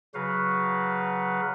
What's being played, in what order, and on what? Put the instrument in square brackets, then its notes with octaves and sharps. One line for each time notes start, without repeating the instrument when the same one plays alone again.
[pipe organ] C#3 F#3 F#4 B4 F5